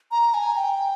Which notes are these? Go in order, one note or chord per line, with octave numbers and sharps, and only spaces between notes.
A#5
G#5
G5